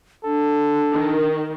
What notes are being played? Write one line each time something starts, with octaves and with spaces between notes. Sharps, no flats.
D4 A4
D#3